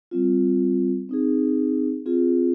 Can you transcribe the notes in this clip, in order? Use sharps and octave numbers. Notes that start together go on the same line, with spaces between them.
G3 C4 F4
C4 D#4 G#4
C4 F4 G#4